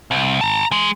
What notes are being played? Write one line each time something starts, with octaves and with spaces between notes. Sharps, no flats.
C2
A5 A#5
E3 G#3